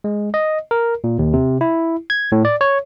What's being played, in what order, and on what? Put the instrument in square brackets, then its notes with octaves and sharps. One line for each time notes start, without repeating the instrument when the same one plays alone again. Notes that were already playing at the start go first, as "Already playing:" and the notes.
[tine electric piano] G#3
D#5
A#4
A#2
D#2
C3
E4
G#6
A2
D5
C#5